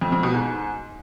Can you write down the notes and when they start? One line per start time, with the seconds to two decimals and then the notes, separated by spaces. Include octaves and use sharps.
0.01 F2
0.12 F2
0.23 B2
0.34 G#2